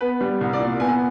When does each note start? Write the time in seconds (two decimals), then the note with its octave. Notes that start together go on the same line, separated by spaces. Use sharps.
0.01 B3 B4
0.21 G3
0.41 C2
0.53 D5
0.59 A#2
0.80 B3 G#5